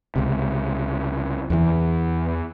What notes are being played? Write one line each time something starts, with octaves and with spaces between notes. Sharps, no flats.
C#2 C3
E2 E3